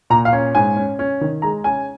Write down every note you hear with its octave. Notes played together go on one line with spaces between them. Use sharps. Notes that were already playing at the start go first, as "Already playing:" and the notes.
A#2 A#5
F5
C#4
G#2 G#5
C#4
C#4
D#3
G#3 A#5
C#4 G#5